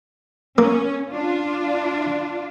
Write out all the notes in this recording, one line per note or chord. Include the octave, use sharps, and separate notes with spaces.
A#3 C#4
D4 F4